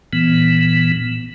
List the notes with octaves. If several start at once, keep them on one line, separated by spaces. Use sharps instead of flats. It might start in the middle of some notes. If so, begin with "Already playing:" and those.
A#2 E3 B3